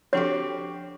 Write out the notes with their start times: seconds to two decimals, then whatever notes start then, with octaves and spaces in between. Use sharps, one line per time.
0.13 F3 C4 D4 F#4 G4 A4 C#5